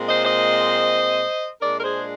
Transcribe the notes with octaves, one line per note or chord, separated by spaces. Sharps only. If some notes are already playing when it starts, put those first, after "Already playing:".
Already playing: A#2 G#3 C4
C5 D#5
C5 D#5
A#2 G#3 D4 A#4 D5
A#4
G#4 C5